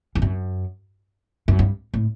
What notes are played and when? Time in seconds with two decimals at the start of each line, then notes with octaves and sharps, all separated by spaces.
0.15 E2
0.22 F#2
1.48 F#2
1.59 G2
1.94 A2